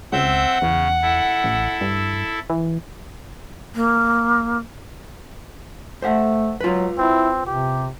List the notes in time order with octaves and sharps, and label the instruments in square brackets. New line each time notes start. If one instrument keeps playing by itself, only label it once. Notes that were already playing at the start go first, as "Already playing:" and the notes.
[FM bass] C#2 [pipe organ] C4 E5 G6 [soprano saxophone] F#5
[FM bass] E2 [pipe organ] C#3
[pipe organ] E4 A4
[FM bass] A1
G2
E3
[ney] A#3
[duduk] A3 [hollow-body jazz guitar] C5 E5 F#5
[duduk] F#3 [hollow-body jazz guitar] F4 B4
[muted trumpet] C4 [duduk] E4
[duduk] C3 [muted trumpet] G4